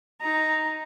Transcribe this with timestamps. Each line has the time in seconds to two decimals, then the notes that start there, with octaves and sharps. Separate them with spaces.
0.21 D#4 A#5